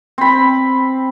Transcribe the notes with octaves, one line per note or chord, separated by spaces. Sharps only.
C4 B5